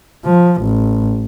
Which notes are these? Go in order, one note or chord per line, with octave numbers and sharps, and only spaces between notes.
F3
A1